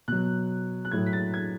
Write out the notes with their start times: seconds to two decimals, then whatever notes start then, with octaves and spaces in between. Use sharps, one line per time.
0.08 B2 F#3 F#6
0.85 F#6
0.91 A2 F#3 G#6
1.06 B6
1.13 A6
1.34 G#6